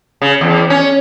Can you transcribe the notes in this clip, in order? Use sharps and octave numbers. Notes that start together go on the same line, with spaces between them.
C#3
E2
C#4